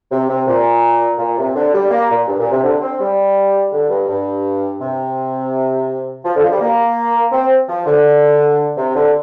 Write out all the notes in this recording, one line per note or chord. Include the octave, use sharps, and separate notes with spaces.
C3
C3
A#2
A#2
C3
D3
G3
A#3
A#2
G2
A#2
C3
D3
C4
G3
D3
G2
G2
C3
F3
D3
F3
G3
A#3
C4
F3
D3
C3
D3